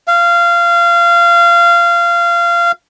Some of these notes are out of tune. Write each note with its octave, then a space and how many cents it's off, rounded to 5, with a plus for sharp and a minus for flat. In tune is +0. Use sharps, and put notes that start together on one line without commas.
F5 -25